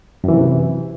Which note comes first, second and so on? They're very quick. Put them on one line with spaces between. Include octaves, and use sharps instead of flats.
F#2 E3 C3